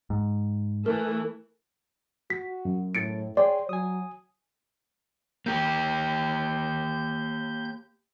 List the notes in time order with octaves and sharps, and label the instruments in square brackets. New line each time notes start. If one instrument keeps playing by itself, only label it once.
[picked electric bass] G#2
[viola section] E3 A3 A4 [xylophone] A#4
[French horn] F#4 [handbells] B6
[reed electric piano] F#2
[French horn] A2 [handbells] A6 C#7 D7
[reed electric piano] G#4 G5 C6 [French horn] C#5 [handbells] D5
[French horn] F#3 [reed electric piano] G#5 D#6
[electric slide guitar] A#3 G4 [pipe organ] G6